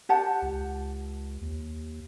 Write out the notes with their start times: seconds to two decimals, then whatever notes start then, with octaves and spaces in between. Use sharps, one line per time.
0.09 G4 F#5 A5
0.42 C#2
1.41 D#2